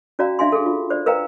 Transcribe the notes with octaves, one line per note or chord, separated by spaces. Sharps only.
C#4 F#4 D5 F5 A#5
D4 E5 F5 G#5 C6
G#4 A4
F4
C5 D5
A#4 B4 F5 G5 A#5